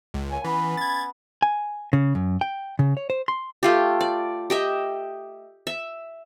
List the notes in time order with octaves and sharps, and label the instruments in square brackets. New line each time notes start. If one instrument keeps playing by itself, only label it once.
[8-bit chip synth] C#2
[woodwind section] A#3 C#5 G#5
[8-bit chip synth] E3 [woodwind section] B3 C#4 B5
[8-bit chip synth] G#6 A6
[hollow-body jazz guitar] G#5
C#3
F#2
G5
C#3
C#5
C5
C6
[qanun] A3 F4 G4
D5
G4 D#5 E5
E5